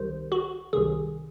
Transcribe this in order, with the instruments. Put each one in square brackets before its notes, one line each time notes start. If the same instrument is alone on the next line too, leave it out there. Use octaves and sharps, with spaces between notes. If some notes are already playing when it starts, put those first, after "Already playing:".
Already playing: [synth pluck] C2 C3 D#3 C5
F#4
C2 C3 D#3 G#4